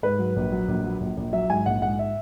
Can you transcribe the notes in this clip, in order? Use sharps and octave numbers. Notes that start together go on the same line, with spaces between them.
G#2 B4
F#3
A#1
F#3
A#1
F#3
A#1
A#1
F#3 E5
G#2 G#5
A#1 F#5
G#2 F#5
E5